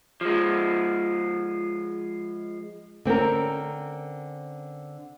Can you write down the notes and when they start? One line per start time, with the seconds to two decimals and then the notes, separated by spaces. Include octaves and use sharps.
0.21 F3 G#3
3.05 D3 C4 C#4 A#4